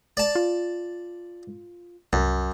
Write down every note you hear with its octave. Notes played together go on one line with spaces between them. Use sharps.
D5 A5
F4
C2 F#2